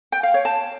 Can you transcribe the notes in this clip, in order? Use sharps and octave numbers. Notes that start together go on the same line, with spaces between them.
G5
F5
C#5
A5